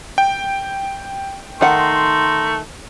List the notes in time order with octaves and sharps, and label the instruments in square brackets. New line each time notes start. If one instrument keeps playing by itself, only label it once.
[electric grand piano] G5
[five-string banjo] D#3 F#5 [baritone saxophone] A3 [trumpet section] A#5 C6